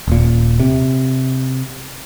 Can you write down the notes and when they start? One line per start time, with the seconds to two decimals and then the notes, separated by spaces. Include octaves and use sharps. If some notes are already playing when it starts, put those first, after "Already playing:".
0.08 D#1 A#2
0.60 C3